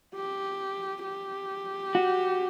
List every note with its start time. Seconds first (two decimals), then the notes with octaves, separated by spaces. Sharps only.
0.15 G4
1.04 G4
1.95 F#4